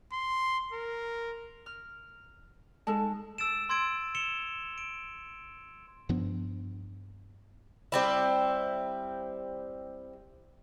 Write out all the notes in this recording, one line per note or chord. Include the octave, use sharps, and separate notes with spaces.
C6
A#4
F6
G#3 D#4 A4 A5
E6 A6 D7 E7
C6 E6 G#6 A6 D7
C#7 E7 F7 G7
D7 E7
G2 F3 B3 D4
G3 C4 E4